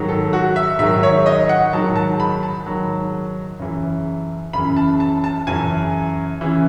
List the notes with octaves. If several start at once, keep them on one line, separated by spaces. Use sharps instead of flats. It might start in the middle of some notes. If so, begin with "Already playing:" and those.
Already playing: G#2 D#3 F#3
A4
F#4
E5
G#2 D#3 F#3 E5
C#5
D#5
F#5
G#2 D#3 F#3 A5
A5
B5
A5
G#2 D#3 F#3
F#2 C#3 E3
F#2 C#3 E3 B5
A5
A5
A5
F#2 C#3 E3 G#5
C#3 E3